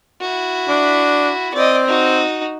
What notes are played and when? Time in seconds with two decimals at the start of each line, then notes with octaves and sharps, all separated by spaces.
0.21 E4 F#4
0.68 D4
1.54 C4 D5 D#5
1.87 D#4 F#4